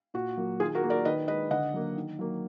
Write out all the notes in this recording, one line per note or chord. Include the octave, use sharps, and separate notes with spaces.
A#2 F#4
F#3 A#3
D#3 F4 G#4
F#4 A#4
A#3
A#4 D5
D#3 B4 D#5
G#3 B4 D#5
D3 D#5 F#5
F#3 A#3
D#3
F#3 A#3